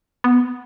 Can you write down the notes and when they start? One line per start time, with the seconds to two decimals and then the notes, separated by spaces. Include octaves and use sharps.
0.24 B3